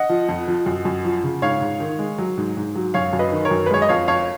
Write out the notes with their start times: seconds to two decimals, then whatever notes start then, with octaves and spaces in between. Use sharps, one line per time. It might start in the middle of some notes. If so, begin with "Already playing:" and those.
Already playing: D#5 F#5
0.09 F3
0.29 F2
0.48 F3
0.66 F#2
0.85 F#2
1.05 F3
1.23 C#3
1.42 G#2 C#5 F5
1.61 G#2
1.80 D#3
1.99 G#3
2.18 F#3
2.37 G#2
2.57 G#2
2.75 F#3
2.94 F#2 C#5 F5
3.13 F#2
3.19 B4 D#5
3.32 D#3
3.45 A#4 C#5
3.51 F#2
3.66 B4
3.70 G#3 C#5
3.82 D#5
3.89 F2 C#5 F5
4.08 F2 C#5 F5